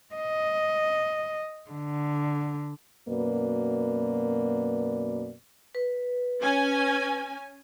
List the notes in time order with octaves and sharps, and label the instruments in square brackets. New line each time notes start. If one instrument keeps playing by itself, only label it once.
[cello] D#5
D3
[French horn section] F#2 B2 A#3 B4 D5
[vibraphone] B4
[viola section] C#4 G#5